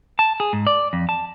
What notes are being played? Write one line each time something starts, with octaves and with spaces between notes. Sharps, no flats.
A5
G#4
G#2
D5
F2
A5